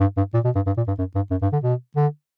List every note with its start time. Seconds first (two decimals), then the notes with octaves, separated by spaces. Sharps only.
0.01 G2
0.17 G2
0.34 A#2
0.45 B2
0.55 G2
0.66 G2
0.77 A#2
0.88 G2
0.99 F#2
1.15 G2
1.31 F#2
1.42 G2
1.53 D3
1.64 B2
1.96 D3